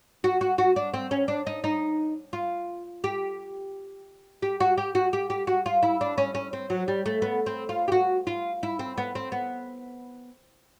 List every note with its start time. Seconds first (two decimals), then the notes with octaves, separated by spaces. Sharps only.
0.24 F#4
0.41 F#4
0.58 F#4
0.76 D4
0.94 C4
1.11 C#4
1.28 D4
1.47 D#4
1.64 D#4
2.33 F4
3.04 G4
4.42 G4
4.60 F#4
4.78 G4
4.95 F#4
5.13 G4
5.30 G4
5.47 F#4
5.66 F4
5.83 E4
6.01 D4
6.18 C#4
6.35 C#4
6.53 C4
6.70 F#3
6.88 G3
7.06 A3
7.22 B3
7.46 C4
7.69 F4
7.88 G4
7.92 F#4
8.27 F4
8.63 E4
8.79 C4
8.98 B3
9.15 C4
9.32 B3